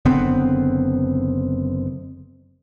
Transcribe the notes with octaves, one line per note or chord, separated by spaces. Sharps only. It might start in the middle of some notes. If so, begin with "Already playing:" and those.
F#1 D3 B3 C4